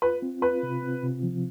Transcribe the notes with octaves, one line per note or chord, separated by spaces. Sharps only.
F4 B4
C4
F4 B4
C3
C4
C3
F3